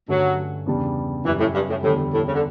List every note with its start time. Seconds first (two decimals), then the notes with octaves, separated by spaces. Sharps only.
0.08 G2 D3 F#3 A3 C#4
0.66 E2 C#3 G3 D4
1.25 F#2 C#3 E3 G3
1.40 A2
1.54 G2
1.69 A2
1.83 E2 A2 D3 G3
2.12 A2
2.27 C#3
2.34 D3